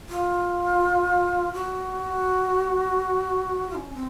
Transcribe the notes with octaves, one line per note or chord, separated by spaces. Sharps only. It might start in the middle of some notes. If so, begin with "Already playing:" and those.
F4
F#4
F4
C#4
C4